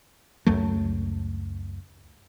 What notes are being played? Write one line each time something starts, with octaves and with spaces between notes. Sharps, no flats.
C#2 F#2 F#3 A3